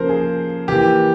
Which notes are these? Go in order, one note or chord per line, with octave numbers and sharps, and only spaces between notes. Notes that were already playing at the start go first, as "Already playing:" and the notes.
Already playing: C#3 F3 A#3 A#4 C5
G#4
E3 A#3 G4